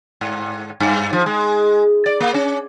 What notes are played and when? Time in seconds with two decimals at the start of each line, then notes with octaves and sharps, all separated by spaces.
0.21 G#2
0.80 G2
1.13 F3
1.26 G#3
2.06 D5
2.20 A#3
2.34 C#4